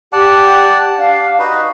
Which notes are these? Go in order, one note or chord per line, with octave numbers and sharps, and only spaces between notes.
G4 D5 F#5 A5
D4 F5
D#4 F#4 B4 D#5